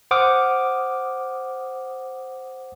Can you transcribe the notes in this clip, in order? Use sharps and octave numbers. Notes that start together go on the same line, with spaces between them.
C5 F#5 D6 D#6 F6